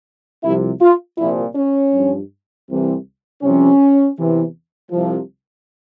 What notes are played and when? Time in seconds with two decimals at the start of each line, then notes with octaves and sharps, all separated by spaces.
0.43 C2 C3 F3 E4
0.81 F4
1.18 C2 A#2 F3 E4
1.56 C#4
1.93 G2 F3
2.68 C2 C3 E3
3.42 C2 C3 F3 C#4
4.17 E2 C3 E3
4.91 C2 C3 F3